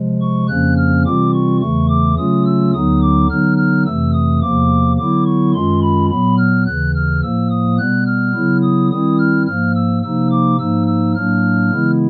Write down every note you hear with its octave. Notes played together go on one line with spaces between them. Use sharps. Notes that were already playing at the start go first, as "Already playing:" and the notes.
Already playing: C3 F3 G#3
C#6
F2 C#3 F3 A#3 C#4 F#6
F6
C3 E3 G3 C4 F4 D6
C#6
E2 C#3 E3 A3 C#6
D6
C#3 F#3 A3 C#4 F4 D#6
E6
D2 D3 F#3 B3 D#4 D#6
D6
D3 F#3 B3 D#4 F6
F6
F2 C3 E3 A3 E6
D#6
E2 C3 F3 A#3 D6
D3 F#3 B3 E4 D6
C#6
F#2 D#3 G#3 C#4 F4 C6
B5
A#2 F#3 B3 B5
F6
D#2 C#3 E3 F#6
F6
A2 F3 A#3 E6
D#6
B2 G3 B3 F#6
F6
C#3 F#3 B3 E4
D#6
D#3 G3 C4 E4 D#6
F6
G#2 F3 A#3 F6
E6
C3 F3 A#3 D#4 E6
D6
G#2 F3 A#3 D#4 E6
E6
A2 F#3 A#3 D4 F6
C#3 E3 G#3 B3 E4